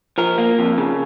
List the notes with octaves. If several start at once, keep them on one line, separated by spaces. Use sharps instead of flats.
F3 A#4
A#3
F2
C#3